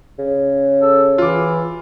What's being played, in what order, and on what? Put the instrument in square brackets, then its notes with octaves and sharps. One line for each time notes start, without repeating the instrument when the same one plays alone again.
[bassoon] C#3
[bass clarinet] A4
[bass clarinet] E3 [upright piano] F4 D6